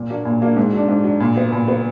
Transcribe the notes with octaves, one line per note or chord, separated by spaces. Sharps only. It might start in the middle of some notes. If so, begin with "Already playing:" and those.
Already playing: A#2
F#3 A#3 D4
A#2
F#3 A#3 D4
G#2
F#3 D4
G#2
F#3 D4
A#2
F#3 B3
A#2
F#3 B3